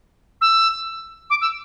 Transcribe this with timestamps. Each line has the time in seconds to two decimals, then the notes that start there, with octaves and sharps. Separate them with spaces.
0.41 E6
1.30 D6
1.41 E6